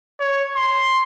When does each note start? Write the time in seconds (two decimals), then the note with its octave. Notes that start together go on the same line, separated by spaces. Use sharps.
0.20 C#5
0.56 C6